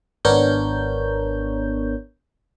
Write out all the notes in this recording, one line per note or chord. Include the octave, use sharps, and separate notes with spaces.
G#1 B3 D4 A#4 C#5 G6